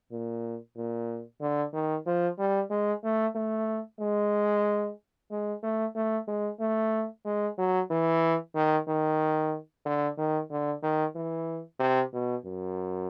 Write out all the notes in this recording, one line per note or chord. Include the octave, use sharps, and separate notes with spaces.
A#2
A#2
D3
D#3
F3
G3
G#3
A3
A3
G#3
G#3
A3
A3
G#3
A3
G#3
F#3
E3
D#3
D#3
D3
D#3
D3
D#3
E3
C3
B2
F#2